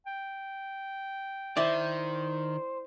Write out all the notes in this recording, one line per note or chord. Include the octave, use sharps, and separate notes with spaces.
G5
D#3 E4 C5 D5